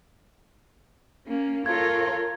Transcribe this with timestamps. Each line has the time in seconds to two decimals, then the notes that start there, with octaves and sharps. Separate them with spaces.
1.27 A#3 C#4
1.66 F4 A4 A#4 C#5 G#6